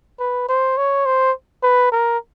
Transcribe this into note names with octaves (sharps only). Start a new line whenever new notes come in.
B4
C5
C#5
C5
B4
A#4